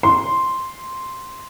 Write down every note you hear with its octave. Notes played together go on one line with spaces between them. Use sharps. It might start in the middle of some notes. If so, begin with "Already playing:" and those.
C6